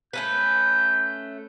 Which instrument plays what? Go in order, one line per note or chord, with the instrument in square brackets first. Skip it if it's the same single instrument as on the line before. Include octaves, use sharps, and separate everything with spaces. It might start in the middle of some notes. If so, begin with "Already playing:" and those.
[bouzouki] A3 C#4 B4 [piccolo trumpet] G6